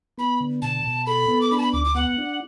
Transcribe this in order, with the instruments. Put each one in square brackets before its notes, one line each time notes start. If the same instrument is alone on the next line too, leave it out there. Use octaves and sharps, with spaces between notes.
[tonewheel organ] B3 [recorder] B5
[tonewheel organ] D3
[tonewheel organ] B2 [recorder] A5
[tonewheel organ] B2
[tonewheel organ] A4 [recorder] B5
[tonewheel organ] B3
[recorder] D6
[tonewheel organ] D4 [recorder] B5
[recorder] A5
B5
[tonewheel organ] D2 [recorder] D6
[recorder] D6
[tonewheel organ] B3 [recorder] F#5
[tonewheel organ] D4